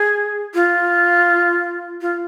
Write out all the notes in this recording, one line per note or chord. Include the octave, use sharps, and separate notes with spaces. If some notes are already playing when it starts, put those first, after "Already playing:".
Already playing: G#4
F4
F4